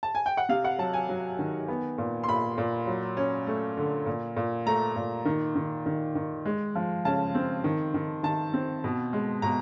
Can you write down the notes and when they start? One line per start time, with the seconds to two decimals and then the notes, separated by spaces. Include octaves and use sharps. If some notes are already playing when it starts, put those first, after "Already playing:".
0.03 A5
0.15 G#5
0.26 G5
0.37 F#5
0.49 C3 F5
0.64 F#5
0.78 F#3 A5
0.93 G#5
1.09 F#3
1.39 D#3
1.68 B3
1.98 A#2
2.24 C6
2.28 A#2 B5
2.58 A#2
2.87 F#3
3.17 C#4
3.47 A3
3.77 D3
4.06 A#2
4.37 A#2
4.66 A3 A#5
4.96 A#2
5.25 D#3
5.56 D#3
5.86 D#3
6.15 D#3
6.45 G#3
6.75 F3
7.05 C#3 A5
7.35 C4
7.64 D#3
7.94 D#3
8.23 D#3 A5
8.54 C4
8.84 B2
9.13 G#3
9.42 B2 A#5